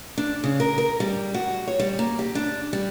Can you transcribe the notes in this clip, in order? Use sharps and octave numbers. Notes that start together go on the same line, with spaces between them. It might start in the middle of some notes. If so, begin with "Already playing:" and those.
D4
C#3
A#4
A#4
G3
F#4
C#5
G3
A#3
G4
D4
G3